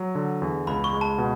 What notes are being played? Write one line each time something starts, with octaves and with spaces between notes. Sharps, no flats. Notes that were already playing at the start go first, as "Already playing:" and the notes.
Already playing: F#3
D3
E2
C#2 B5
C#6
G#3
A5
B2